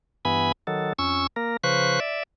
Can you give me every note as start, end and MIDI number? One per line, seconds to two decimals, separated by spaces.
0.25 0.52 43
0.25 0.52 52
0.25 0.52 59
0.25 0.52 80
0.25 0.52 83
0.67 0.93 51
0.67 0.93 54
0.67 0.93 69
0.99 1.27 41
0.99 1.27 61
0.99 1.27 85
0.99 1.27 88
1.36 1.57 58
1.36 1.57 70
1.64 2.00 49
1.64 2.00 53
1.64 2.00 71
1.64 2.00 72
1.64 2.00 85
1.64 2.00 90
2.00 2.23 74
2.00 2.23 76